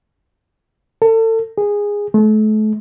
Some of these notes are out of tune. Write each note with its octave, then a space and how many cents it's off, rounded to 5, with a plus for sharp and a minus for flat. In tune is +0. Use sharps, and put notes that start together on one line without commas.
A4 +35
G#4 -15
A3 -35